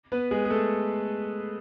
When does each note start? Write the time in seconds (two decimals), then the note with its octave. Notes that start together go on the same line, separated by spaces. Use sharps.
0.12 B3 B4
0.31 G#3 G#4
0.45 G#4
0.50 A3 A4